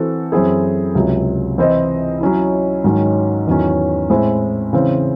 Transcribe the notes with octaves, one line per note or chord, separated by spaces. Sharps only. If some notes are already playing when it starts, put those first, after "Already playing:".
Already playing: E3 C4 F#4 A4
F#2 E3 C4 E4 G#4
C#2 C3 F#3
E3 C4 E4 C5 D#5
F#3 C#4 E4
G#2 D#3 F#3 C#4
E2 D#3 F#3 C#4
A2 G#3 C4 E4 C5
C#3 E3 C4